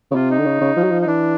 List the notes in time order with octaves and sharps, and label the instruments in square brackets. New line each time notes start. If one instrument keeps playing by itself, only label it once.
[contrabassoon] C#3
[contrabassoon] C3 [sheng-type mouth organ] F4
[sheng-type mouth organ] D#4
[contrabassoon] D3
C#3
C#3
F3
F#3
F3
[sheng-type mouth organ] D#4
[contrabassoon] E3 [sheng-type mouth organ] D4